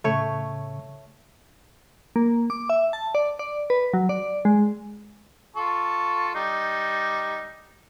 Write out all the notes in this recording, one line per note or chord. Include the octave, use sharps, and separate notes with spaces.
A2 C#3 A3 C#5
A#3
D6
E5
A5
D5
D5
B4
F#3
D5
G#3
F4 A4 C#6
G3 D#4